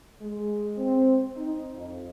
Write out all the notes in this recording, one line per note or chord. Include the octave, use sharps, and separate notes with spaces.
G#3
C4
D#4
F2